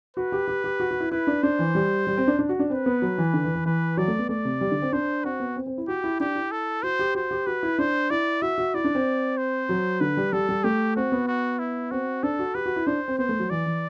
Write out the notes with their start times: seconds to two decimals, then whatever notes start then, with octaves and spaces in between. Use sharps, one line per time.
0.17 F#4 B4
0.32 G4
0.48 G4
0.64 G4
0.80 F#4
0.91 F#4
1.00 E4
1.11 E4 B4
1.27 D4
1.43 D4 C5
1.59 E3
1.75 G3
2.07 G3
2.17 C4
2.27 D4
2.39 D4
2.49 F#4
2.59 D4
2.70 C4 B4
2.86 B3
3.02 F#3
3.18 E3
3.34 D3
3.44 E3
3.55 E3
3.66 E3 B4
3.97 F#3 D5
4.08 A3
4.19 B3
4.29 A3 D5
4.45 C3
4.61 G3
4.71 D3
4.82 C4
4.93 D4 C5
5.24 C4 F#4
5.40 B3
5.56 C4
5.67 C4
5.78 E4
5.88 F#4 G4
6.04 E4
6.20 D4 G4
6.36 E4
6.51 A4
6.83 F#4 C5
6.99 G4
7.15 F#4 C5
7.31 G4
7.46 F#4 B4
7.63 E4
7.78 D4 C5
8.10 E4 D5
8.42 F#4 E5
8.58 F#4
8.74 E4 D5
8.84 D4
8.95 C4
9.37 C5
9.69 F#3
10.01 D3 B4
10.17 G3
10.33 G3 A4
10.49 G3
10.64 A3 G4
10.96 C4 F#4
11.12 B3
11.28 F#4
11.59 E4
11.91 C4 F#4
12.23 D4 A4
12.39 F#4
12.55 G4 B4
12.66 F#4
12.76 E4
12.87 D4 C5
13.08 C4
13.18 B3 C5
13.29 A3
13.39 F#3
13.50 E3 D5
13.66 E3